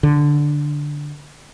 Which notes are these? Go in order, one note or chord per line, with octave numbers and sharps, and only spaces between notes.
D3